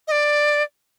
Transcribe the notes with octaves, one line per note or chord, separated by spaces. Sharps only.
D#5
D5